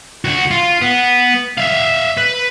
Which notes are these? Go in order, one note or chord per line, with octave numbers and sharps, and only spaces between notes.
D2 F#4
F4
B3
E5 F5
B4